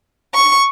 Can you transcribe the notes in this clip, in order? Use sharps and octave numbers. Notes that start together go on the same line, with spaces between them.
C#6